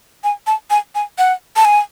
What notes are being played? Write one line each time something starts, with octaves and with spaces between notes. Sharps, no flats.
G#5
A5
G#5
G#5
F#5
A5
G#5